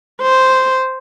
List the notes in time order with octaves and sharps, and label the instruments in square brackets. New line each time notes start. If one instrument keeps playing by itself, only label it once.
[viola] C5